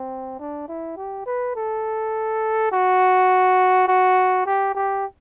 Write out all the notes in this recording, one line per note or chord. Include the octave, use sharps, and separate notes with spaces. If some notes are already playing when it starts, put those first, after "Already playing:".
Already playing: C4
D4
E4
G4
B4
A4
F#4
F#4
G4
G4